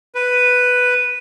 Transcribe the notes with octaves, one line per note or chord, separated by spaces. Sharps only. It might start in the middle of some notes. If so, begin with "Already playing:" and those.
B4